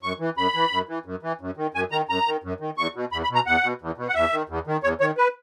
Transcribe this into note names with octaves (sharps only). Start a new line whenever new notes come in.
F#2 C#6
E3
F#2 B5
E3
F#2
E3
F#2
E3
F#2
D#3
F#2 G#5
D#3 A#5
F#2 A#5
D#3
F#2
D#3
E2 C#6
B2
E2 B5
B5
B2
A#5
E2 F#5
B2
E2
B2
F#5
E2 E5
D#3
E2
D#3
E2 C#5
D#3 C#5
B4